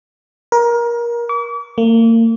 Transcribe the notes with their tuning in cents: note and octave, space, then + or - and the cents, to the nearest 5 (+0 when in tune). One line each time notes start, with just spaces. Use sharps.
A#4 +25
D6 -40
A#3 -35